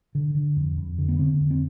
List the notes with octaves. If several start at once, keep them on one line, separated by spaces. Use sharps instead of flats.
D3
D3
F2
F2
D3
B3
D3 C4
F2
C4